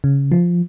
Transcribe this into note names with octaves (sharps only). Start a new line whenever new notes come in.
C#3
F3